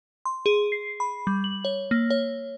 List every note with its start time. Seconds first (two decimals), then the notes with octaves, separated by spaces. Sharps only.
0.25 C6
0.46 G#4
0.72 C7
1.00 B5
1.27 G3
1.44 F#7
1.65 C#5
1.91 A#3
2.10 C#5